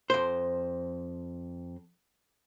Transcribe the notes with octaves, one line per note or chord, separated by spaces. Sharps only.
F2 C5